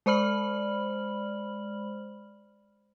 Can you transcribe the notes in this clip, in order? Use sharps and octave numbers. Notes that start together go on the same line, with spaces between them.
G#3 C5 D5 B5 F6 F#7